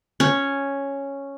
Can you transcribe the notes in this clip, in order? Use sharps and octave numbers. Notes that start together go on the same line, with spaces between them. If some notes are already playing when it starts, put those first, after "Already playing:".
C#4